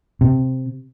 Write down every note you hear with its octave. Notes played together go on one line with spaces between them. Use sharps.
C3